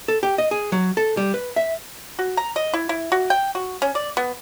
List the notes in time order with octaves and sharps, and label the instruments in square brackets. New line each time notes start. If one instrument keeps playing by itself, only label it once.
[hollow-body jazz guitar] A4
G4
D#5
G#4
F#3
A4
G3
B4
E5
[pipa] F#4
A#5
D#5
E4
E4
F#4
G5
F#4
C#4
D5
B3